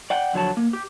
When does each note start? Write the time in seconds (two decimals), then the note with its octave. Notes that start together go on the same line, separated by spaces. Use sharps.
0.10 D5 F#5 G5
0.33 F2 D3 F#3 C#5 F#5 A5
0.57 A#3
0.73 G4